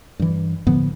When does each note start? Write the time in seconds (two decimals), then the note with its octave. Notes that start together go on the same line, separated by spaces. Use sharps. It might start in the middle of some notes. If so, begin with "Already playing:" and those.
0.19 G2 E3
0.67 A2 D3 F3 B3